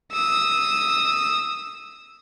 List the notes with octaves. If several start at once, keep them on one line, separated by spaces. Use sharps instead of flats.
D#6 E6